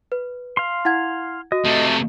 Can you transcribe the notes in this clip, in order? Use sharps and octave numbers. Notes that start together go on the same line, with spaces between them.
B4
F5 C6
E4 F#5 G#6
F#4 D#5
C3 A3